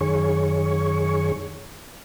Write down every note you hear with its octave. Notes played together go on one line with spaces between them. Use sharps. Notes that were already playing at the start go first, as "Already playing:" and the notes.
F#2 D#3 G#4 C#5 C#6